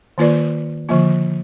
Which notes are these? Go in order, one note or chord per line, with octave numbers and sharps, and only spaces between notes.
D#3 A#3 F4 B4 D5
D3 F3 A#3 F4